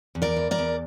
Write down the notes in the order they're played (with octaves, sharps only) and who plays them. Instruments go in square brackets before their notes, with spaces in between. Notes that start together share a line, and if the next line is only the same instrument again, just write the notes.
[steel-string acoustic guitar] E2
A#4 D5
E3
A#4 D5
E2